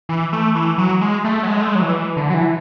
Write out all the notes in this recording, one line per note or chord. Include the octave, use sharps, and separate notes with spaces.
E3
A3
E3
F#3
G#3
A3
F#3
G#3
A3
G#3
F#3
E3
D3
F#3
E3